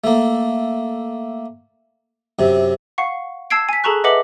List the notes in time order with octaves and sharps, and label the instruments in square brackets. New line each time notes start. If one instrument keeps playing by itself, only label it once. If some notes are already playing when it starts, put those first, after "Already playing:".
[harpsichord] A3 A#3
F#2 C3
[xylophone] F5 F#5 C#6
A5 E6 G#6 C7 D7
G#5 B6
G#4 A4 A5 A#5 C#6 F#6
B4 D#5 E5 F#5 D6 F#7